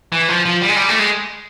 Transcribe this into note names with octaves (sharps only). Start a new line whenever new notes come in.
E3
F3
F3
G3
G#3
G3
A3
G#3